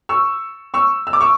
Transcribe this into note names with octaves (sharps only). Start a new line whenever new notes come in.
C#6 E6
C#6 E6
E6
D6
C#6 E6